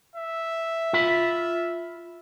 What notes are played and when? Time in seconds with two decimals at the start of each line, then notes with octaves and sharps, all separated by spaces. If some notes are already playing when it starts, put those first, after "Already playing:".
0.16 E5
0.93 F4 B5